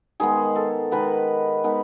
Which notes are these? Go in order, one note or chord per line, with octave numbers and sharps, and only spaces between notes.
D#3 G#3 B3 G#4
A4
D#3 G#3 B3 B4
D#3 G#3 B3